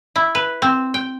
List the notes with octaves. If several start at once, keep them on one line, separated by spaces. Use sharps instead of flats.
E4
B4
C4
G5